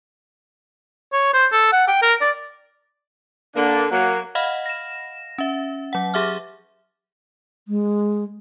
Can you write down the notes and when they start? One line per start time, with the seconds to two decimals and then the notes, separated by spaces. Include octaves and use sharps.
1.13 C#5
1.34 C5
1.52 A4
1.72 F#5
1.88 G5
2.02 A#4
2.21 D5
3.55 D3 A#3 D4
3.91 F#3 A#3 F#5
4.35 D#5 F5 F#5 B5 F6
4.66 A#6 E7
5.38 C#4 E5
5.93 F#3 F#5
6.14 G4 G#4 E5 D6 F6
7.68 G#3